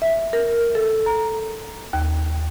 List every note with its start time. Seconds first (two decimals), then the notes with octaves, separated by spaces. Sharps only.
0.02 E5
0.33 A#4
0.75 A4
1.06 A#5
1.93 D#2